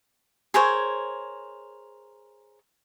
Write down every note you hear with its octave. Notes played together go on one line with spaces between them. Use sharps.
G#4 A#4 C5 C#5